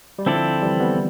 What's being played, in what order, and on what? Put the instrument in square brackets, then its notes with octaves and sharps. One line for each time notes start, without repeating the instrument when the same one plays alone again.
[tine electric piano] G3
[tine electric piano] D3 F3 [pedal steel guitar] C4 E4 A4 D5
[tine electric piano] E3 G3
G3 B3